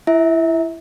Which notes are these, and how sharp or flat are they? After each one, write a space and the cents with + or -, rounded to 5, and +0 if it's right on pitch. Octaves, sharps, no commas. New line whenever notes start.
E4 +20 E5 -25